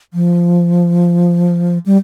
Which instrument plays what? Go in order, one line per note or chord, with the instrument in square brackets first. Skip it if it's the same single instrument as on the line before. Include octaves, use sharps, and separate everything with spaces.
[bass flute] F3
G3